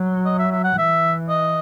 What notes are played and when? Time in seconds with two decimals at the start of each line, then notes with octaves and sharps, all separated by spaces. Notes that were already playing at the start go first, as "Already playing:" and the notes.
Already playing: F#3
0.25 D#5
0.39 E5
0.52 E5
0.64 F#5
0.78 E3 E5
1.29 D#5